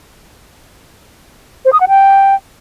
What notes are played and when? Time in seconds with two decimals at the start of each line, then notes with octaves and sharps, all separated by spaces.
1.65 C5
1.73 D#6
1.80 F#5
1.88 G5